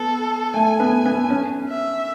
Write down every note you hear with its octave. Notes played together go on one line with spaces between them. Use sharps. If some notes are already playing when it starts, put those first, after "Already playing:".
Already playing: B3 A4
A3 G#5
B3
B3
C#4
E5